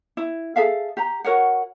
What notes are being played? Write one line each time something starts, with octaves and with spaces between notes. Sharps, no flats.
E4
G#4 A4 E5 F5
G4 A#5
F#4 A#4 C#5 F#5